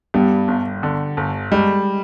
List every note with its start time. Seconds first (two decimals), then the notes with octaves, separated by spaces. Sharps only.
0.14 G2 G3 B3
0.48 G1
0.83 D3
1.17 G1
1.51 G3 G#3